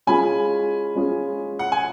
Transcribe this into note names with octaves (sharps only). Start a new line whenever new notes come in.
G#3 C#4 F4 G#4 G#5 B5
G#3 C#4 F4 G#4
F#5
G#5